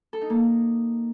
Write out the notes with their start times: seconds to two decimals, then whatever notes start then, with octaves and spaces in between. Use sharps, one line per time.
0.13 A4
0.21 D#4
0.30 A#3